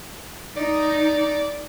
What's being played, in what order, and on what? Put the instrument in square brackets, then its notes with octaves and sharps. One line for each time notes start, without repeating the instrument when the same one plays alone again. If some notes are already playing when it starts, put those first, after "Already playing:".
[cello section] D#4 [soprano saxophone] D5